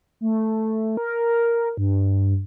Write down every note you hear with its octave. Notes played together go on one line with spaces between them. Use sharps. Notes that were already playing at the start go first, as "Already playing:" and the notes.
A3
A#4
G2